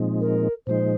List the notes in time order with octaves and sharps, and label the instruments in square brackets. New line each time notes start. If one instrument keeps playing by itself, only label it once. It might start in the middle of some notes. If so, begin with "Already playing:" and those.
Already playing: [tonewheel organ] A#2 F3 G#3 C4 D#4
[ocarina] A#4
[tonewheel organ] A#2 F3 G#3 D#4 [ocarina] C5